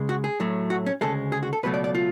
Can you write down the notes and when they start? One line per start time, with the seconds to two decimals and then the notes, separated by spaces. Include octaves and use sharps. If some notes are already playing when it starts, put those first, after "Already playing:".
Already playing: C#2 C#3 G#3
0.09 F#4
0.24 G#4
0.40 A2 F#3 A3
0.70 F#4
0.86 C#4
1.01 D2 C#3 G#3 A4
1.32 G#4
1.43 F#4
1.53 A4
1.63 C#2 B2 F#3 A3 B4
1.74 D5
1.84 D5
1.95 F4